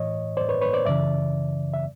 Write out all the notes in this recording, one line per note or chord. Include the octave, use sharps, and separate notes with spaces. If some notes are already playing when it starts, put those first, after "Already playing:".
Already playing: A2 E3 C#5 D#5
C5 D5
B4 C#5
B4 C#5
C5 D5
F#2 C#3 E3 D5 E5
E5